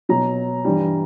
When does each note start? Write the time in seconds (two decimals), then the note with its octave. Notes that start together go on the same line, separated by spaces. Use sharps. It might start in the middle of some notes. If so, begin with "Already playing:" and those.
0.09 B2 F#3 A#5
0.65 G2 E3 G3